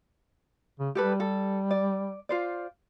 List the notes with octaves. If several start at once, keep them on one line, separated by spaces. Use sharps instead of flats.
C#3
G3 G4 A4 B4
A4
D5
F4 C5 D5